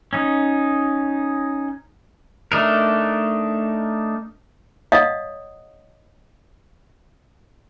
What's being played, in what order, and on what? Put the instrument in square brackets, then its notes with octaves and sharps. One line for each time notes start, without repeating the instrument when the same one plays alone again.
[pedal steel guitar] C#4 D#4
A3 D4 D#4 A#4
[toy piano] C#5 D#5 F5 F#5 D#6